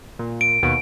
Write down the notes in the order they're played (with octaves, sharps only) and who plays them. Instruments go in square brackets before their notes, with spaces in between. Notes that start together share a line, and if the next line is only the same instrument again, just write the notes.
[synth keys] A#2
[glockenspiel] D7
[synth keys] D#2 B2